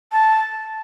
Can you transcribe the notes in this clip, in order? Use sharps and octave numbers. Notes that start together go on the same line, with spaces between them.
A5